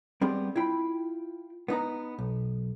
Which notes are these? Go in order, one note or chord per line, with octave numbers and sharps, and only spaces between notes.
G3 B3 C4 G4 G#4 D5
E4 F4 G5 B5
B3 D#4 B4 A#5
B1